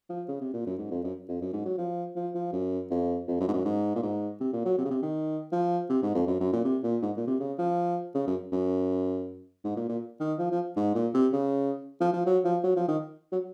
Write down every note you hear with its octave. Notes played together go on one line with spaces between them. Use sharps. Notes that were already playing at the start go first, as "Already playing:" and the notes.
F3
C#3
C3
A#2
F#2
G#2
F2
F#2
F2
F#2
G#2
F#3
F3
F3
F3
F#2
F2
F2
F#2
G#2
F#2
G#2
A#2
G#2
C3
A#2
F#3
C3
C#3
C3
D#3
F3
C3
G#2
F2
F#2
F#2
A#2
C3
A#2
G#2
A#2
C3
C#3
F3
C#3
F#2
F#2
G#2
A#2
A#2
D#3
F3
F3
G#2
A#2
C3
C#3
F3
F3
F#3
F3
F#3
F3
D#3
F#3